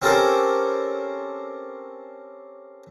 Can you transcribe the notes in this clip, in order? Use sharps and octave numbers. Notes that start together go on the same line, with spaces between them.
C4 C#4 G4 A4 A#4 C5